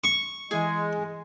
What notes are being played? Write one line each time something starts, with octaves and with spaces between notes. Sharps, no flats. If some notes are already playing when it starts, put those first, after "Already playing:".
C#6
E3 G#3 E4 G#4 G#5